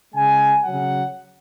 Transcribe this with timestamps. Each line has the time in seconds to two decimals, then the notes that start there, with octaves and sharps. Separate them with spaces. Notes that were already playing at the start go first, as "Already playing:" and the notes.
0.14 C#3 G#3 G#5
0.63 C#3 F#3 F#5